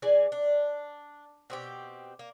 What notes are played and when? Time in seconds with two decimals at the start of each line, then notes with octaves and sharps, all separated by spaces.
0.02 E3 G#4 D5 G#5
0.32 D4
1.50 B2 C4 G4
2.19 A#3